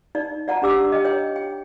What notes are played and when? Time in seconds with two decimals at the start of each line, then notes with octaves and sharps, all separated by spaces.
0.15 D#4 D5
0.48 D5 F#5 A5 A#5
0.62 D4 G4 D6 E6
0.92 D#5 G5
1.05 C#5 G5
1.36 G5